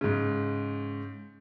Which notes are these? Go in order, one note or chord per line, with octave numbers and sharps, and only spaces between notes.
G#2 C#3